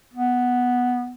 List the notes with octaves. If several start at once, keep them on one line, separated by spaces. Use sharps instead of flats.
B3